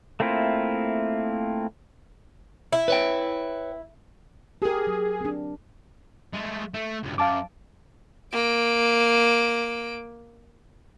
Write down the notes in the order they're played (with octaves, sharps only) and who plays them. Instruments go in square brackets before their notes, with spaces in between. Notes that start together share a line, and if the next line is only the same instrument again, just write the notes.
[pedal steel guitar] A3 A#3 C4 E4 F4
[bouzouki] E4
[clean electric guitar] B4 C#5 G5
[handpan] G4 A#4 [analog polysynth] G#4
[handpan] F#3
C4 D4
[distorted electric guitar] G#3 A3
A3
C#2 G2
[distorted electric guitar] F#2 [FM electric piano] F5 A5 D6
[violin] A#3 D7